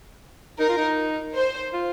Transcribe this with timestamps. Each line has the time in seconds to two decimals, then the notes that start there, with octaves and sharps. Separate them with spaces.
0.60 D#4 A#4
0.69 F4
0.77 D#4
1.36 C5
1.73 F4